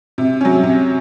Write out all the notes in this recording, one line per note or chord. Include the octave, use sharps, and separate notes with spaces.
C3
F#3 C#4
C3